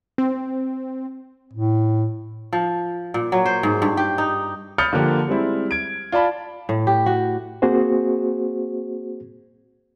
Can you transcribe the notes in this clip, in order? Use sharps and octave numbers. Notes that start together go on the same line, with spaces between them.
C4
A2
F3
A#2
F#3
C5
G#2
G2
G4
D#4
B5 D#6 F6 G6 A6 C#7
D3 F3 A#3 G4
G3 G#3 C4 E4
G#6 D7
F4 D5 A5 B5
A2
G4
F#4
A#3 C4 F#4 G#4 C5